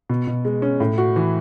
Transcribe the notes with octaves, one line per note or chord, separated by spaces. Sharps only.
B2
B2
G#3
C#4
A2
F#4
E3